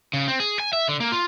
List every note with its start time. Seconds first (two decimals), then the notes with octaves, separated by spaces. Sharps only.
0.13 C#3
0.28 C4
0.40 G#4
0.60 G#5
0.73 E5
0.88 D3
1.00 A#3
1.12 F4